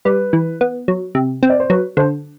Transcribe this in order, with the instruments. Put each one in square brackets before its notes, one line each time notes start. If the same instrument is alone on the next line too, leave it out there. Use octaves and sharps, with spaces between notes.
[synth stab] G3 [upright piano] B4
[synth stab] E3
B3
F#3
C3
C4
[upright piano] D5
C5
[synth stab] F#3 [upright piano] B4
[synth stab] D3 [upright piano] C5